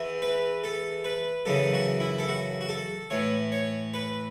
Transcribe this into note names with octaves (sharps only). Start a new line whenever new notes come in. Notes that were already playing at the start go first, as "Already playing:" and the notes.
Already playing: E2 E3
B4
A4
B4
F#2 C#3 E3 A4
F#4
E4
A4
F#4
F#4
A4
A2 E3 C#5
C#5
B4